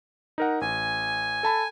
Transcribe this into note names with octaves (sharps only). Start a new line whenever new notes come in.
D#4 A#4 F#5
A1 G#5
A4 A5 B5